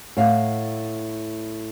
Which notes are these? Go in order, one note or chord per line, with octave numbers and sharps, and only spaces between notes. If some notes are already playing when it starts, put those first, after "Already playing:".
A2 F5 F#5